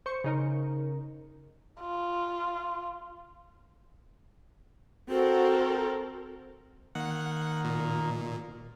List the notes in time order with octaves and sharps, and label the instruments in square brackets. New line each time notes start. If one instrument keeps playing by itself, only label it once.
[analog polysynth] C5 C#6 C#7
C#3 D#4 A#4
[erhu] F4
[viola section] C4 A4 A#4 [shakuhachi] F#4
[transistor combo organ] D#3 A#3 [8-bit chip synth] F#5
[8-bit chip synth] A#2